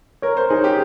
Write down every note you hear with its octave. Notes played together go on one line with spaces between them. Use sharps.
A#4 C#5
C5
D#4 G#4
G4